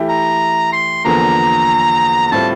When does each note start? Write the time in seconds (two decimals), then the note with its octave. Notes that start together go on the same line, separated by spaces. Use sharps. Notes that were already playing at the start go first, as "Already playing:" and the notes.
Already playing: E3 A3 E4 G4
0.09 A#5
0.73 C6
1.05 E2 D3 F3 A#3 A#5
2.27 A#5
2.32 A2 G3 C4 F4 A5